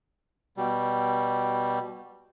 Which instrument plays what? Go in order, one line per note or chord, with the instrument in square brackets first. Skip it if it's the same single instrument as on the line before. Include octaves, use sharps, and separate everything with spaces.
[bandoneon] B2 G3